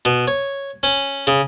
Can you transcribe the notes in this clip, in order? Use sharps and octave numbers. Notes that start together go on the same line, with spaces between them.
B2
C#5
C#4
C#3